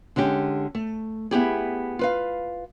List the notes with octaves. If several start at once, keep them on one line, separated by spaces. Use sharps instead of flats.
D3 G#3 C#4 G4
A3
B3 E4 G4 G#4
F4 B4 F5